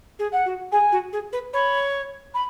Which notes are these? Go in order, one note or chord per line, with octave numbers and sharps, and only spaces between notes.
G#4
F#5
F#4
G#4 G#5
F#4
G#4
B4
C#5 B5
B5